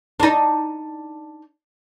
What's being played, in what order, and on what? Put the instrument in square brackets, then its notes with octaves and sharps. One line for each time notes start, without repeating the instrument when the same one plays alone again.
[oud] D4 D#4